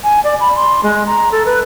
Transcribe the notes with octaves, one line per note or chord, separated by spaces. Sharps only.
G#5
D5
B5
C6
G#3
A#5
A4
B4